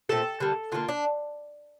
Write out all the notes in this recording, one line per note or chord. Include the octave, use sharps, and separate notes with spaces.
A#2 A3 C4 A4
D3 G3 A#3
D3 G3 A#3 F4
D4